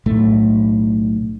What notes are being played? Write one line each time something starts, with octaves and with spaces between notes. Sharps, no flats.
B1 A2 A3